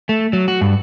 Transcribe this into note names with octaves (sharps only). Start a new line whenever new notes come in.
A3
F#3
F#4
G2